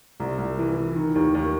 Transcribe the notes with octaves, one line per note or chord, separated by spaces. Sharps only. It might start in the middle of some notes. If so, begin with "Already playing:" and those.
C2
C2
E3
E3
D#3
D#2
D#2